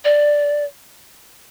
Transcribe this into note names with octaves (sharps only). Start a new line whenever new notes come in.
D5